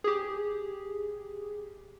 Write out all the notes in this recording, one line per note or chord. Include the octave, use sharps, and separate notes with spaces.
G4 G#4